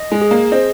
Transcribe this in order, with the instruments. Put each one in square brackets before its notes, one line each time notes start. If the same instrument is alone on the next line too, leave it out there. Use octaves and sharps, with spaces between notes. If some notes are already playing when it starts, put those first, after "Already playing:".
Already playing: [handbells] D#5
[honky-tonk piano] G#3
[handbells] G#4
[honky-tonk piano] A#3
[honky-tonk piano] C4 [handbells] D#5